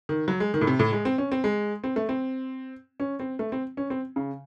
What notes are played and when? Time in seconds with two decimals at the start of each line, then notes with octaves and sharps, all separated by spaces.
0.09 D#3
0.28 F#3
0.40 G#3
0.54 D#3
0.61 A2
0.67 C3
0.79 A2
0.93 G#3
1.05 C4
1.18 C#4
1.32 C4
1.44 G#3
1.84 C4
1.96 A3
2.09 C4
3.00 C#4
3.20 C4
3.39 A3
3.52 C4
3.77 C#4
3.90 C4
4.16 C#3